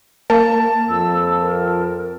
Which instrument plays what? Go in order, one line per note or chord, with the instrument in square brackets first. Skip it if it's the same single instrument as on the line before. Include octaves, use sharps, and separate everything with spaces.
[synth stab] A#3 [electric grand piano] A5
[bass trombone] F2 [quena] E6
[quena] A#4